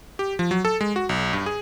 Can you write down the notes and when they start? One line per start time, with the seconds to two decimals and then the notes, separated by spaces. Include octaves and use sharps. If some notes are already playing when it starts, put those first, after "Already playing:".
0.19 G4
0.39 F3
0.51 F#3
0.65 A4
0.81 G#3
0.96 F#4
1.09 B1
1.33 G2
1.46 G#4